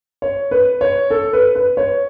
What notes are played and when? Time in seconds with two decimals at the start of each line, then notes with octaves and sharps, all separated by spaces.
0.22 C#5
0.51 B4
0.81 C#5
1.10 A4
1.33 B4
1.55 B4
1.77 C#5